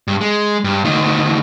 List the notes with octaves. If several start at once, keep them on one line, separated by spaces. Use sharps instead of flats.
G2
G#3
G2
D2 D#3